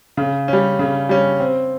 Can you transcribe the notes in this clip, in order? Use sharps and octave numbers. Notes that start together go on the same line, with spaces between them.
C#3
G3 C#4
C#3
G3 C#4
C4